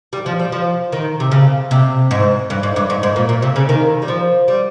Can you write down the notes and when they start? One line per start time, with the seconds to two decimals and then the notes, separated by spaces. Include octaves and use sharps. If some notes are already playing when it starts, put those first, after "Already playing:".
0.13 G3
0.26 F3
0.39 G3
0.52 F3
0.92 D#3
1.20 C3
1.31 C#3
1.71 C3
2.11 G#2
2.50 G2
2.63 G#2
2.76 G2
2.90 G#2
3.03 G#2
3.16 A#2
3.29 A#2
3.42 C3
3.56 C#3
3.69 D#3
4.02 G3
4.08 F3
4.48 G3